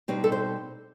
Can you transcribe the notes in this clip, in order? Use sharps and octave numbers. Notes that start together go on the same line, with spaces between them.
B2 G3 C4 D#4 G4
A4
C5